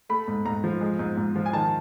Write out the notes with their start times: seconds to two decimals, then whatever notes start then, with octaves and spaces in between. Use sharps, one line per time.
0.09 A3 B5
0.28 G#2
0.45 G#2 A#5
0.64 F3
0.81 G#3
0.99 G#2
1.17 G#2
1.36 F3
1.46 G#5
1.53 D#3 A5